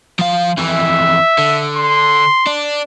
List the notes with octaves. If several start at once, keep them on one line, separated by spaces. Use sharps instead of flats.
F3 F5
F2 E3 E5
D3
C6
D4